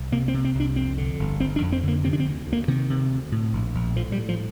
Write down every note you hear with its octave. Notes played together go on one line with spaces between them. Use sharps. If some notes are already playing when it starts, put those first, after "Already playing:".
Already playing: C2
C3 A#3
C4
C3
C4
C2 D4
F2 C4
D3
G1
G1 C4
D4
F2
C4
D3 A#3
C3 C4
D4
C4
D2
D2
A#3
C3 D#3
C3
D2
A2
A#1
A#1
A2 F3
G3
A2
F3